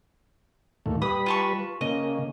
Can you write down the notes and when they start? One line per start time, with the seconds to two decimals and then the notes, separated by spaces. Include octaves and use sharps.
0.86 D#2 A#2 A3
1.02 G3 B4 B5 D#6
1.26 F4 A5 C#6
1.81 C#3 A#3 D#5